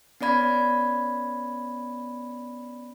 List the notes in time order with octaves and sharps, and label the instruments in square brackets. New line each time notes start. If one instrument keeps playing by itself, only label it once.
[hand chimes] B3 C#4 D5 B5 G#6